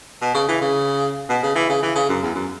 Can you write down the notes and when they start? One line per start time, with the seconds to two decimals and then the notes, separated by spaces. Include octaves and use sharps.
0.21 B2
0.35 C#3
0.49 E3
0.61 C#3
1.29 B2
1.43 C#3
1.55 E3
1.69 C#3
1.83 E3
1.95 C#3
2.09 F#2
2.23 E2
2.35 F#2